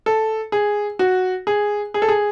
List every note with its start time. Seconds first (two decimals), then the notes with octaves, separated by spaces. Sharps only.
0.06 A4
0.52 G#4
0.99 F#4
1.47 G#4
1.94 G#4
2.02 A4
2.08 G#4